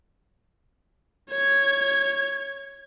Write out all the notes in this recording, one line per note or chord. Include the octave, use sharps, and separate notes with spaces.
C#5 G#6